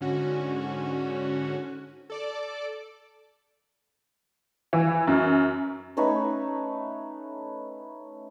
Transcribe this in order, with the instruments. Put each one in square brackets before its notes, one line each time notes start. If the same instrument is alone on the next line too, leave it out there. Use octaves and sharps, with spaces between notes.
[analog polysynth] G#2 D3 C#4 F#4
A4 D5 D6
[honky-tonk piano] E3
F#2
[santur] A3 C#4 D#4 B4